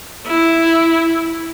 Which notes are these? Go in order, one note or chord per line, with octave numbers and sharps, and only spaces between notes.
E4